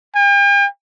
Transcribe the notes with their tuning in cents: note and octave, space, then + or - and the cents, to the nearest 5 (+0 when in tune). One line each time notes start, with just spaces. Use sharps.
G5 +45